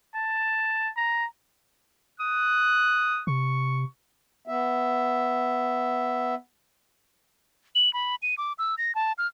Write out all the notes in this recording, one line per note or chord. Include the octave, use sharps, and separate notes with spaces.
A5
A#5
D#6 F#6
C3 C#6
B3 E5
F#7
B5
D#7
D6
E6
A#6
A5
F6